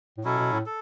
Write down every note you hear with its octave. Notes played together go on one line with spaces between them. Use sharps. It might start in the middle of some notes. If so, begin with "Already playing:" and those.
A2
B2 F#3 C#4 E4 A4
B2
A2
A4